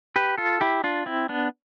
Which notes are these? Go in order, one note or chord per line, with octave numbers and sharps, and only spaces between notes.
G4 B4
F4 A4
E4 G4
D4 F4
C4 E4
B3 D4